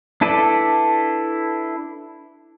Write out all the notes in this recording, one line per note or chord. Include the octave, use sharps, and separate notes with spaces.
D4 E4 A4 B4 D5